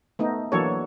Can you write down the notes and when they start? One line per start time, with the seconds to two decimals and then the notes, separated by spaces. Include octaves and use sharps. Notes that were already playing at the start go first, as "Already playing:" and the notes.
0.19 A3 B3 D#4
0.52 E3 F#3 A#3 D4 A4 C#5